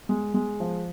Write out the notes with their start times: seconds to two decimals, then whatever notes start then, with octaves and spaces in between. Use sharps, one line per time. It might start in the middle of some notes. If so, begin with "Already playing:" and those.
0.09 G#3
0.34 G#3
0.60 F3